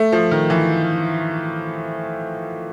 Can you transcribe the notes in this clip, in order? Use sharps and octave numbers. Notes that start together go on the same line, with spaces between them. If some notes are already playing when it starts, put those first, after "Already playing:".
Already playing: A3
F3
D#3
E3